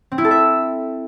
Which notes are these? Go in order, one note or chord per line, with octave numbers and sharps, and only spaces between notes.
C4
E4
A4
E5